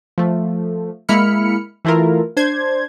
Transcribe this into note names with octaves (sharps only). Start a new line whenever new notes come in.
F3 A3
G#3 A#3 E4 B5 F6 C#7
E3 A3 E4 F4 A#4
D4 C5 G#6